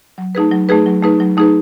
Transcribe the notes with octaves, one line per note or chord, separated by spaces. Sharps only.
F#3
A3 D#4 G#4 B4
F#3
A3 D#4 G#4 B4
F#3
A3 D#4 G#4 B4
F#3
A3 D#4 G#4 B4